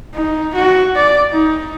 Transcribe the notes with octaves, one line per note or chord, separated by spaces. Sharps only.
D#4
F#4
D5
D#4